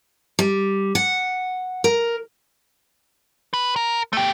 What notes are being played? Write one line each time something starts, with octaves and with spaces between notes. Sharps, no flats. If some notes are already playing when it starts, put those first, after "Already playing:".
G3
F#5
A#4
B4
A#4
A3 G4